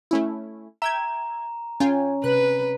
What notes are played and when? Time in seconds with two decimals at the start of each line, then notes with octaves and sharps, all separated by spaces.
0.11 A3 C#4 E4
0.82 E5 G5 A#5 G#6
1.80 C#4 F4 G5 G#5
2.24 C3 B4 F#6